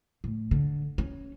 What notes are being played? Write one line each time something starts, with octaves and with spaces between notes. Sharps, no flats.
A2
D3
C#4